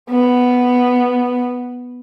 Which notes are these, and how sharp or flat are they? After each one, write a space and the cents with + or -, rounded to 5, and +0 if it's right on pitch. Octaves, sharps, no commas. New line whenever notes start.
B3 +0